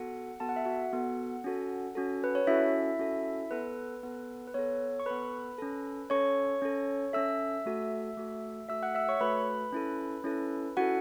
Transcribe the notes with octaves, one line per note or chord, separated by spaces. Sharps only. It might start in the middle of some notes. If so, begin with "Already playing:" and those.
Already playing: B3 F#4 A4 F#5
B3 F#4 A4 A5
F#5
E5
F#4 F#5
B3 F#4 A4
C#4 F#4 A4
C#4 F#4 A4
B4
C#5
C#4 E4 F#4 A4 E5
C#4 F#4 A4
B3 A4 B4
B3 A4
B4
B3 A4 C#5
C#6
B3 A4 B4 B5
C#4 A4
C#4 A4 C#5 C#6
C#4 A4
C#4 A4 E5 E6
A3 F#4 A4
A3 F#4 A4
A3 F#4 A4 E5 E6
F#5 F#6
E5 E6
C#5 C#6
A3 F#4 A4 B4 B5
C#4 E4 A4
C#4 E4 A4
C#4 E4 F#4 A4 F#5